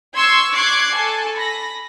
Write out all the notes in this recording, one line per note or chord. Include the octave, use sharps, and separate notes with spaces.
C6 C#6 E6 G#6
C#6 D6 F#6 G#6 C7
A4 G#5 A5
B5 A#6